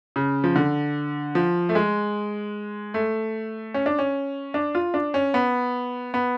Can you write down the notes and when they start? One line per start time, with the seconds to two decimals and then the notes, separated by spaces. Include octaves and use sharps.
0.16 C#3
0.44 F3
0.56 D3
1.35 F3
1.69 A3
1.75 G#3
2.94 A3
3.74 C#4
3.86 D4
3.99 C#4
4.54 D4
4.75 F4
4.94 D4
5.14 C#4
5.34 B3
6.14 B3